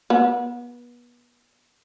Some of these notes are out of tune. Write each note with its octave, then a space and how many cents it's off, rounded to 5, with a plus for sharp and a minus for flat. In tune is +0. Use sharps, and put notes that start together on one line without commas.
B3 -30